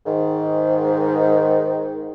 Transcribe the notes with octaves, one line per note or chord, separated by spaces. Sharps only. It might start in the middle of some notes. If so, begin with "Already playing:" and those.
G#2 D#3